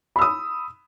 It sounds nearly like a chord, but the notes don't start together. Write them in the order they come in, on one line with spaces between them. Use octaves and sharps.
B5 E6 D#6